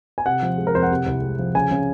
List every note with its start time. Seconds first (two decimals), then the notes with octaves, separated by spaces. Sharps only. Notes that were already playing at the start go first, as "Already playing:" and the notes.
0.18 G#5
0.26 C3 F#5
0.42 F3
0.58 G#3
0.67 A#4
0.75 F2 C5
0.83 F#5
0.91 C3
1.07 C2
1.22 G#3
1.39 F3
1.55 C#3 G#5
1.71 C#3